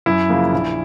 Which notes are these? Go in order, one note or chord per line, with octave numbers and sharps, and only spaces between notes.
F#2 E4
C#3 F3 A#3
A#1